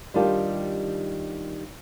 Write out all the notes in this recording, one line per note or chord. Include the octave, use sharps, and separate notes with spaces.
D#3 G3 D4 F4 G4